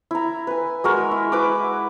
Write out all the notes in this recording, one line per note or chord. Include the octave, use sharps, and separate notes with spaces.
E4 A#5
B4 G#5
G#3 F#4 A#4
E4
E4 B4 D6